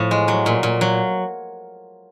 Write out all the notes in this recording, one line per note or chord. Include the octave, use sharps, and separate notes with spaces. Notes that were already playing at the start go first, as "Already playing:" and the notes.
Already playing: A2 F3
G#3
F#3
A#2
A#2
F#3